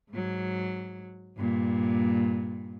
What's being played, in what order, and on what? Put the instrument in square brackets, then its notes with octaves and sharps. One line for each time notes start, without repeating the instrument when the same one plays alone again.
[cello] G#2 F#3
G2 A#2